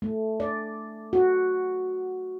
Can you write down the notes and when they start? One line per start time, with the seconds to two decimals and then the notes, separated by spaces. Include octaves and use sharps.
0.02 A3
0.40 D5
1.13 F#4